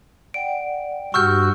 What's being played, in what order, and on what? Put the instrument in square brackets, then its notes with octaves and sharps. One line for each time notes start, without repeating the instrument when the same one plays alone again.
[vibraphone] D5 F#5 G5 [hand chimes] D7
[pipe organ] G2 F#4 [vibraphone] G4 [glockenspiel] C#6 F6 G6 [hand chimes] E6